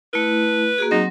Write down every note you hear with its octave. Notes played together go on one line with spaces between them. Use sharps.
A3 E4 B4
A#3 F#4 G#4
F#3 C4 D#4